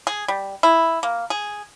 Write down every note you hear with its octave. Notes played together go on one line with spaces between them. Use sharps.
G#4
G3
E4
A#3
G#4